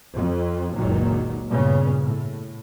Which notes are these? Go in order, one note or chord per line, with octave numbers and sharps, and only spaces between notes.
F2
F#1 C#2 A#2 D#3 F#3 A#3
G2 A#2 C#3 B3 C#4
A2